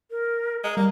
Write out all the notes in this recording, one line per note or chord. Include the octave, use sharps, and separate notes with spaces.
A#4
G#3 A#5
G3 A#3 A#5